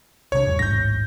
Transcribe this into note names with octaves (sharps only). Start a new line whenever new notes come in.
B1 C3 D4 C#5
G1 E2 G2
D1 A1 G#2 G6 A#6